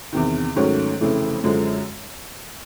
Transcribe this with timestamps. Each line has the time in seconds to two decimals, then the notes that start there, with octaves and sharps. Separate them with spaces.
0.13 E2 C3 D#3
0.56 G#2 D#3 F#3 A3 C#4
1.01 F1 F2 C#3 E3 A3
1.43 F#2 D3 F3 G#3